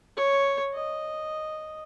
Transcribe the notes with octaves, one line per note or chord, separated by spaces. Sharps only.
C#5
D#5